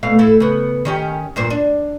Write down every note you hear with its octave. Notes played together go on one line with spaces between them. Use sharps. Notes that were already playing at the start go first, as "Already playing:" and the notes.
B2 A3 F5
A2 E4 A4
C#3 B3
D#3 C#4 G4
G2 A#2 C5
D4